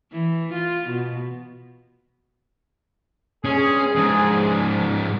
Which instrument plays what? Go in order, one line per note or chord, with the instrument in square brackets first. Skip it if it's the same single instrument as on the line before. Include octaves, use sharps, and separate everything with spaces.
[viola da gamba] E3
F4
B2
[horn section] G2 G#3 G#4 [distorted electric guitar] C#4
[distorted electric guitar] G#2 F3